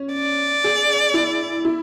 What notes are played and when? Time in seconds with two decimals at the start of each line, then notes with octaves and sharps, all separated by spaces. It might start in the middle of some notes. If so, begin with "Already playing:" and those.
Already playing: C#4
0.13 D5
0.64 G#4
1.14 E4
1.65 E4